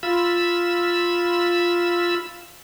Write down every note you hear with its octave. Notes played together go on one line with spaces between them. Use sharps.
F4 B5 E6